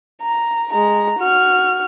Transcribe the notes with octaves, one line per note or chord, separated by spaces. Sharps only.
A#5
G#3 A#5
F#4 F6